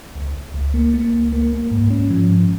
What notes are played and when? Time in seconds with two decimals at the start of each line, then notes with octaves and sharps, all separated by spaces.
0.15 C#2
0.35 C#2
0.54 C#2
0.74 A#3
0.94 A#3
1.13 C#2
1.32 A#3
1.52 A#3
1.71 G#2
1.90 C#4
2.10 F3
2.30 G#2